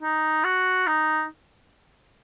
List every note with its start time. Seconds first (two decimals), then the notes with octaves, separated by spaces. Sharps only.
0.02 D#4
0.44 F#4
0.87 D#4